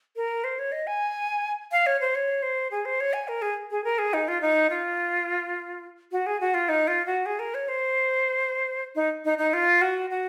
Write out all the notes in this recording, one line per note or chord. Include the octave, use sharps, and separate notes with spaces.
A#4
C5
C#5
D#5
G#5
F5
C#5
C5
C#5
C5
G#4
C5
C#5
G#5
A#4
G#4
G#4
A#4
G#4
D#4
F4
D#4
F4
F#4
G#4
F#4
F4
D#4
F4
F#4
G#4
A#4
C#5
C5
D#4
D#4
D#4
F4
F#4
F#4